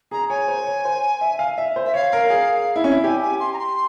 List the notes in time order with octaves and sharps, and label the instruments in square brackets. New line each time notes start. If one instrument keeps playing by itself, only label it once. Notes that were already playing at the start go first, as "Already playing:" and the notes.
[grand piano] G#4 [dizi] A#5
[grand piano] C#5 [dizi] G#5
[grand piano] C5
C#5
C5
E5
F5
E5
C5
[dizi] E5
[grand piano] C#5 [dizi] F5
[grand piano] A#4
G#4
E4
C#4
E4
[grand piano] G4 [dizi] G#5
[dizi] G#5
C6
A#5
C6